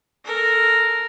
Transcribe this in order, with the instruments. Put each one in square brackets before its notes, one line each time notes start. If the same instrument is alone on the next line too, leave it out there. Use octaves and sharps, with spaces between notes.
[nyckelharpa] A4 A#4